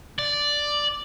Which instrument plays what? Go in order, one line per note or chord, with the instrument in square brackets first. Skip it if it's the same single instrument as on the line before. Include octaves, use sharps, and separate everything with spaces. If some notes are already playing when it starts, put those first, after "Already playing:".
[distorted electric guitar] D5